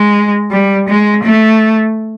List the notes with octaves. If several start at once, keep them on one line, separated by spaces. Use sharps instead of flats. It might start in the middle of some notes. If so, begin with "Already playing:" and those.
Already playing: G#3
G3
G#3
A3